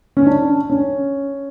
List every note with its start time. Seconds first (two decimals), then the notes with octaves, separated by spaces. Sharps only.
0.17 C#4
0.27 D4
0.70 C#4